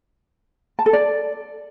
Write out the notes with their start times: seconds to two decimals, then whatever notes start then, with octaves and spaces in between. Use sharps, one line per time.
0.79 A5
0.86 A4
0.93 D5